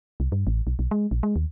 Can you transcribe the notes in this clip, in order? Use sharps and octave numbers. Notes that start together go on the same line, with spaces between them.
C2
G2
A1
B1
B1
G#3
A#1
G#3
D#2